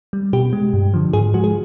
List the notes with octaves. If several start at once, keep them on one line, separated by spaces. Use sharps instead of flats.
G3
B2 G4
G#3
G2
D3 F3
G#2 G#4
F3 G#3 F#4
G#4